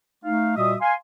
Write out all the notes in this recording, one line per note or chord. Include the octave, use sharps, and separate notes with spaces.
A3 D#4 F5
A#2 G3 F#4 D#5 E5 D#6
F5 G#5 C6